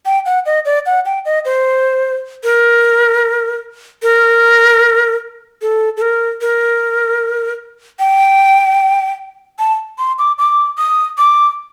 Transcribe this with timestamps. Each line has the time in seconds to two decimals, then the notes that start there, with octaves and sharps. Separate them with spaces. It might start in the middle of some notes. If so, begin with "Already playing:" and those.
0.05 G5
0.25 F#5
0.46 D#5
0.65 D5
0.86 F#5
1.05 G5
1.25 D#5
1.45 C5
2.44 A#4
4.02 A#4
5.62 A4
5.97 A4
6.01 A#4
6.41 A#4
7.99 G5
9.59 A5
9.98 C6
10.18 D6
10.38 D6
10.78 D#6
11.18 D6